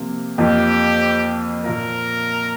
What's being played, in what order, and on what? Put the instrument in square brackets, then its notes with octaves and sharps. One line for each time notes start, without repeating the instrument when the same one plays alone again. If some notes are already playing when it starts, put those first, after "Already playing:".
Already playing: [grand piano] C3 F3 A#3
[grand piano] F2 F3 A#3 [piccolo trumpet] G4
[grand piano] A#2 A#3 F4 [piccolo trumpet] A#4